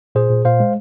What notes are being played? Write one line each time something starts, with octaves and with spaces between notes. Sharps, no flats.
A#2 G#4 C5
A#2
A#2 C5 F5
G#3